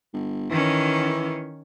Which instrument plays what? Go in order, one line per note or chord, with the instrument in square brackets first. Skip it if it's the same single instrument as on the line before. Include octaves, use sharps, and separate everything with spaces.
[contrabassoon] G1
[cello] D#3 C#4 [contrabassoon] E3